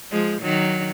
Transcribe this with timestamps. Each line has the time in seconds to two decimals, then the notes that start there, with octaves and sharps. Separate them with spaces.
0.12 F3 G#3
0.42 D#3 F#3